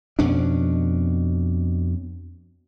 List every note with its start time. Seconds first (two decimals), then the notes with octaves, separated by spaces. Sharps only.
0.19 F2 B2 C#4 D4